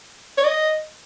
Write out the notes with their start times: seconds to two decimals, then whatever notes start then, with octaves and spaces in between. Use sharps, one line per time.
0.38 C#5
0.45 D#5